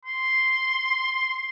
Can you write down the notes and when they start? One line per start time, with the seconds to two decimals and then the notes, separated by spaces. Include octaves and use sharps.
0.05 C6